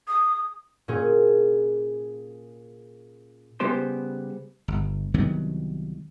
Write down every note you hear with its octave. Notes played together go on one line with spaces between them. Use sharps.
D#6
A#2 C#4 G#4
C#3 G3 B3 G4 C5 C6
G1
C2 D#3 F#3 B3